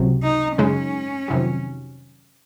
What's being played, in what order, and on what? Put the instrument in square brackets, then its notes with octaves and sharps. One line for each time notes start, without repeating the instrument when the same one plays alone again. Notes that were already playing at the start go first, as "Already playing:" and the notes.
Already playing: [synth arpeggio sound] C#2 C3 F#3
[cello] D#4
[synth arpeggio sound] F#2 C#3 G#3 D#4 [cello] C#4
[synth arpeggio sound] F2 C3 D#3 F#3